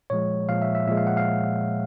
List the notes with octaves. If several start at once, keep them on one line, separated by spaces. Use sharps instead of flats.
A#2 F3 G#3 C#5
A#2 F3 G#3 F5
E5
E5
A#2 F3 G#3 E5
F5
F#5
F5